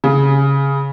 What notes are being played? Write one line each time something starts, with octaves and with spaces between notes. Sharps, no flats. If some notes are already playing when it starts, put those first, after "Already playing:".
C#3